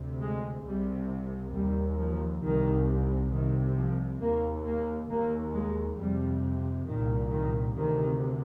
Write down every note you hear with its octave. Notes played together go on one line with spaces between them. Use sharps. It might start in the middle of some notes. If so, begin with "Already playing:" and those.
Already playing: D2 C3
G#3
C2 C3 G3
D#2 G3
F3
C2 C3 D#3
C2 C3 D#3
F3
D#2 A#3
A#3
D#2 A#3
G#3
F2 C3 G3
C2 A#2 D#3
D#3
D2 C3 D#3